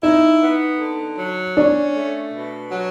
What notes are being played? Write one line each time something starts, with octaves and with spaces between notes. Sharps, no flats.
D#4 E4
B3
D3
F#3
C#4 D4
A3
B2
F#3